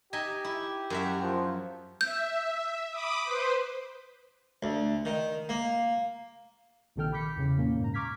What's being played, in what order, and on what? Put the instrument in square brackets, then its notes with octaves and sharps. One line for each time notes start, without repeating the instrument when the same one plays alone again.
[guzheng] D#4 E5 G#5 [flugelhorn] G4
[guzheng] E4
F#2 F#4 E5
[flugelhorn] F3
[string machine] E5 [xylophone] G6
[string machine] B5 D6 D#6
B4 C5
[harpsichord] D2
D#3
A#3
[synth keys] A#1 C3 D#3 A4 G5 F6
B5 D6 G6 B6 C#7
E2 C#3
E2 A#2 A#3 C#4
G#2 A#5
A#5 C#6 D6 F6 G#6 B6